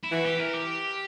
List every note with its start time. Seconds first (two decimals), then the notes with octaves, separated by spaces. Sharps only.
0.03 E4
0.11 E3 F#4
0.25 G4
0.39 A#4
0.53 G4